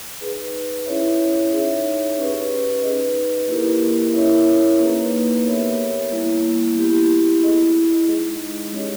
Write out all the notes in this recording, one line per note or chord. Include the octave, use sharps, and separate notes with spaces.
D#4 G#4 B4
C#4 E4 G#4 C#5 E5
D#4 G#4 C#5 E5
C#4 G4 B4
D#4 G#4 B4 D#5
A#3 E4 G4 A#4 D#5
C#4 E4 A#4 C#5 E5
A#3 D#4 G#4 B4
B3 G4 A#4 C#5 E5
G3 A#3 E4
B3 E4 G4
E4 G#4 D#5
G#3 D#4 G#4 D#5
G#3 C#4 G4 C#5